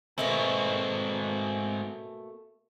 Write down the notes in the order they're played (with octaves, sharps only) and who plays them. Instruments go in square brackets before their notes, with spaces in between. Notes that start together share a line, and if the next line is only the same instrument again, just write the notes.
[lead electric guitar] G#2 C4 [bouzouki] B2 A3 A#3